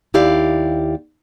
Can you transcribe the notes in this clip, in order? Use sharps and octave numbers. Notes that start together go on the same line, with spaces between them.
D#2 E4 G4 D5 F5